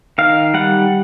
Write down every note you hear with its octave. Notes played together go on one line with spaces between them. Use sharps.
D#3 F5
G3 F#5